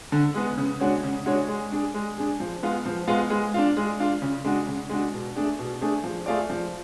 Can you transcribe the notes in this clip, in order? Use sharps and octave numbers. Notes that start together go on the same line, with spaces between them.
D3
G#3 B3
C#3
G#3 D4 F#4 C#5
C#3
G#3 D4 F#4 C#5
G#3
D4 G#4
G#3
D4 G#4
F3
G#3 B3 F4
F3
G#3 B3 F4
G#3
D4 F4
G#3
D4 F4
C#3
G#3 D4 F#4
C#3
G#3 D4 F#4
B2
A3 D4 G#4
B2
A3 D4 G#4
F3
A3 F4 G#4 D5
F3